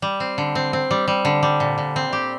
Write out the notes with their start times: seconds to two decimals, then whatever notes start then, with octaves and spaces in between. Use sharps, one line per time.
0.02 G3
0.20 C4
0.38 D3
0.55 C4
0.73 C4
0.91 G3
1.08 G3
1.25 D3
1.43 G3
1.60 A#2
1.78 A#2
1.96 C4
2.13 G4